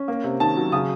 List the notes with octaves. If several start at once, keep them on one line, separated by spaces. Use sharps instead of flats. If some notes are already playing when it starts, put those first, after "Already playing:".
Already playing: C#4
A#3
C3
D#3 A5
F#3
C#3 D#6